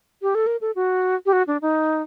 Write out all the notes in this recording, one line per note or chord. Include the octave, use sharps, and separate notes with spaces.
G4
A4
A#4
A4
F#4
G4
F#4
D4
D#4